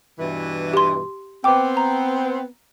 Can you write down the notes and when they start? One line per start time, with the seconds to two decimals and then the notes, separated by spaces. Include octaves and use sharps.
0.19 G2 B2 E3
0.74 G4 C6
1.44 B3 C4 G5 D6
1.77 A#5